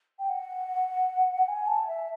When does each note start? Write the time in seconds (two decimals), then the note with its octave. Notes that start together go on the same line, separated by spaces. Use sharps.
0.19 G5
0.29 F#5
1.48 G#5
1.68 A5
1.87 E5